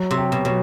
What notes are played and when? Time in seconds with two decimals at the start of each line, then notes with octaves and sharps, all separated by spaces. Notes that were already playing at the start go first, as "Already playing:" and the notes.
Already playing: F#3
0.11 C3
0.17 G4
0.32 B2
0.45 B2 F#3